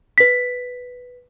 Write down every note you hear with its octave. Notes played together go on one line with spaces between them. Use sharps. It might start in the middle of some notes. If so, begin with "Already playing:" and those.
B4 B6